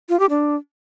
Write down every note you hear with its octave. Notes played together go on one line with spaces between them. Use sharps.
F4
G4
D4